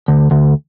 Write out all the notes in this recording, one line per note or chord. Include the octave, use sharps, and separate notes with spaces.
D2
D2